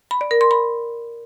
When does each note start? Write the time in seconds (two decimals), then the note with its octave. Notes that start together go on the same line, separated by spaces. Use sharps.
0.11 B5
0.21 D5
0.31 A#4
0.41 C6
0.51 B5